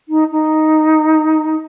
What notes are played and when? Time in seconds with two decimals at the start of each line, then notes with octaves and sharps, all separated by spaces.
0.09 D#4
0.31 D#4